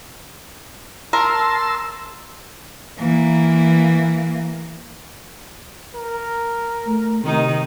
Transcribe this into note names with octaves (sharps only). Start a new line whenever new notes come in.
A#4 A5 C6 E6
E3 A#3
A#4
A3
C3 D#3 D#4